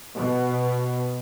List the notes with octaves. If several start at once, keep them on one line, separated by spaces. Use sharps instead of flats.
B2